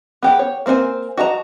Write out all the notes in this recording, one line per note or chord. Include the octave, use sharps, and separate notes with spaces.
B3 G4 G#4
C#5
A#3 C4 D4 C5 G#5
F#4 D#5 A5 A#5